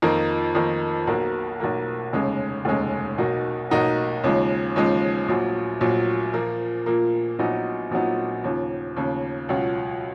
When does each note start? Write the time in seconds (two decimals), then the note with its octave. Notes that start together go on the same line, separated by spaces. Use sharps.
0.02 F2 D#3 A#3 D#4
0.55 F2 D#3 A#3 D#4
1.07 B1 B2 A#3
1.60 B1 B2 A#3
2.13 F1 D#2 C#3 G#3 C#4
2.65 F1 D#2 C#3 G#3 C#4
3.18 B1 B2 A#3 D#4 F#4
3.70 B1 B2 A#3 D#4 F#4
4.24 D#2 C#3 F3 G#3 C#4
4.76 D#2 C#3 F3 G#3 C#4
5.28 A#1 A#2 F#3
5.81 A#1 A#2 F#3
6.34 A#2 F3 A#3
6.86 A#2 F3 A#3
7.39 A#1 A#2 F#3 B3 D#4
7.91 A#1 A#2 F#3 B3 D#4
8.44 D#2 C#3 F3
8.96 D#2 C#3 F3
9.49 C#2 B2 F#3 C#4 F4